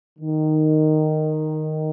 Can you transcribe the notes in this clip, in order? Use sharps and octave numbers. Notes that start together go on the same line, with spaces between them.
D#3